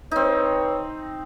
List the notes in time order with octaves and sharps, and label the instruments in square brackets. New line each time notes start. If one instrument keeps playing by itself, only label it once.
[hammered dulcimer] C4 D#4 [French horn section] B4 C#5